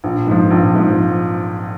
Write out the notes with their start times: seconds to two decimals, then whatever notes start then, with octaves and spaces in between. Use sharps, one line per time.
0.04 A#1
0.27 G#2 F3
0.51 A#1
0.74 G#2 F3